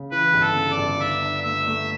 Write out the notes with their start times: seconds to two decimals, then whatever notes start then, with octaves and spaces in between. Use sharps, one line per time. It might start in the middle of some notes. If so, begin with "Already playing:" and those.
Already playing: C#3
0.11 E3 B4
0.34 G1
0.41 A4
0.56 C#3
0.71 D5
0.78 G1
0.99 D4 E5
1.22 D4
1.44 A3 E5
1.67 A3